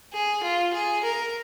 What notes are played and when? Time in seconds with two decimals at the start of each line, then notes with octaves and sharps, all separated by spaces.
0.13 G#4
0.43 F4
0.74 G#4
1.04 A#4